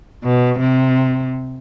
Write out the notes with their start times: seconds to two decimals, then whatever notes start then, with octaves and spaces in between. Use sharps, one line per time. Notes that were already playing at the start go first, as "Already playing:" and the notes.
0.24 B2
0.60 C3